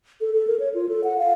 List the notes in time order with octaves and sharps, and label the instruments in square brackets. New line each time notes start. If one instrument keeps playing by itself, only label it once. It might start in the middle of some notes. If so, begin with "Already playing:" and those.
[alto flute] A4
A4
A#4
C#5
F4
A4
F#5
F5